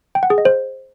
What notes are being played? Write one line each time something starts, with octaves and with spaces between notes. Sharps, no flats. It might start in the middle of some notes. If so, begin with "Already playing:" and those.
G5
F#5
G#4
D#5
C5